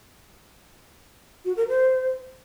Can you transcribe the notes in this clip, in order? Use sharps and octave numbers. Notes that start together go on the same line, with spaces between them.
F#4
A#4
C5